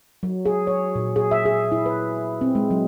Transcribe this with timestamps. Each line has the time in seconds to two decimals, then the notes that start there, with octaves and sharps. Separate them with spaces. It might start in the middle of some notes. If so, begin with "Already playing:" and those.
0.23 F#3
0.45 G#4
0.67 C#5
0.95 A#2
1.16 G#4
1.31 E5
1.45 G#4
1.72 E4
1.86 B4
2.41 C4
2.55 G#3
2.70 F#3